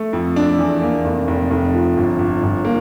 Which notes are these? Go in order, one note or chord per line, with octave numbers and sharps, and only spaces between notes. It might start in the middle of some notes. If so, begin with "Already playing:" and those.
Already playing: A3
F2
D4
E2
A#3
F1
F1
F1
F3
G1
G1
G1
A#3